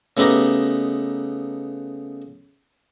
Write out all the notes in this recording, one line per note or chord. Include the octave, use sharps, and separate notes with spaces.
C#3 A3 B3 D#4 G4 A#5